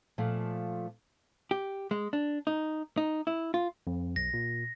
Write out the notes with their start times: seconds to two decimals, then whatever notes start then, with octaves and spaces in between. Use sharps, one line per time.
0.18 A#2 F3 A3
1.51 G4
1.91 G#3
2.13 D4
2.47 D#4
2.97 D#4
3.27 E4
3.54 F4
3.87 F2
4.16 B1 A#6
4.34 A#2